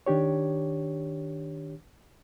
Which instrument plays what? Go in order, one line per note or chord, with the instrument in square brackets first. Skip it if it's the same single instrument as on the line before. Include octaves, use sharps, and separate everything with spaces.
[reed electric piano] D#3 D4 G4 C#5